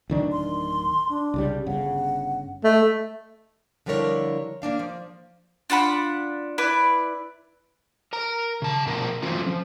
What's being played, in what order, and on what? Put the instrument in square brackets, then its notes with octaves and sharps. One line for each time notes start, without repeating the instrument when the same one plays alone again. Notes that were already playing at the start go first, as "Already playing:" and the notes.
[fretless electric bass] D1 D#3 D4
[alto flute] C6
D4
[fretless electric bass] C2 C#3 G3
[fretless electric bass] G1 C#3 [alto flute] F#5
[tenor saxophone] A3 [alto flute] D#5
[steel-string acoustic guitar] D3 F3 G3 E4 A#4 C#5
A#3 C4 D4 F5
F3
[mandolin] D4 F4 F#5 B5
E4 B4 D5
[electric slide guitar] A#4 A#5
C#3 A5
B2 F3 A#4
E3 F#3 A3 C4 C#4 F4
F3